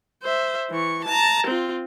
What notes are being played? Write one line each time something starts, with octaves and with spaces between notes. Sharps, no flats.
C5 E5
E3 C#6
A5 A#5
C4 F4